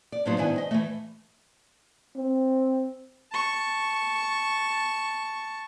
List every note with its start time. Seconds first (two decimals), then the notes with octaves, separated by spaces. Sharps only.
0.12 D5
0.25 A2 F3 F#3 B3 D#4 C5
0.38 G#2 D#3 B3 D4 E4 G#5
0.58 D#5
0.71 E3 A3
2.16 C4
3.31 A5 C#6